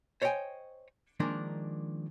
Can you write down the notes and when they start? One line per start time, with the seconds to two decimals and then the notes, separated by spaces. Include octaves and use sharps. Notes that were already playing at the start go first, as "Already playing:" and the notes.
0.22 C5 C#5 D#5 E5 G5 G#5
1.20 D#3 F3 G#3 A#3 D4 A#4